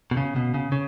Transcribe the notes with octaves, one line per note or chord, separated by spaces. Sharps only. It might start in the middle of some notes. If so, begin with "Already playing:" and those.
B2
C#3
B2
C#3
C#3